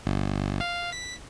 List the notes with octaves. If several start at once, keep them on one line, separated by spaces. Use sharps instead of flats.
G1
F5
B6